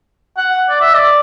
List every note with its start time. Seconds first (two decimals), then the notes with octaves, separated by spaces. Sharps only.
0.37 F#5
0.70 D5
0.81 E5
0.94 D5